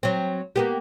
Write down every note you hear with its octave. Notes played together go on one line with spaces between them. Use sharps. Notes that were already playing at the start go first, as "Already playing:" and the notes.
F#3 C4
A#3 B3 G4